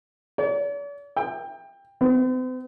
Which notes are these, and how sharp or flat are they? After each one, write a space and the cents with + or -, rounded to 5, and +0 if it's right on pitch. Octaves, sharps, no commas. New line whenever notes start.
D5 -45
G5 +20
C4 -45